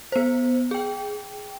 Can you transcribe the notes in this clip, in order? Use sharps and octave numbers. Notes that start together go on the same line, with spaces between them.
B3 C5
G#4 G5